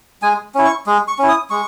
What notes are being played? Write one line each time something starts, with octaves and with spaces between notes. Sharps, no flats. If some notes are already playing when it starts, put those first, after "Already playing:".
G#3 G#5
C#4 E4
C#6
G#3
C#6
C#4 E4
D#6
G#3 C#6